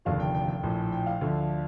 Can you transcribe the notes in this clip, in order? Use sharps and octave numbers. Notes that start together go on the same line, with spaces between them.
F1 D#2 D3 F3 F5
G5
G5
G5
A#1 A2 F3
G5
F5
D2 D3 F3